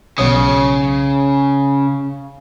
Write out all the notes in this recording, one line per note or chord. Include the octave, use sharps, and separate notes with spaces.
B1 C#3 C#5 D#6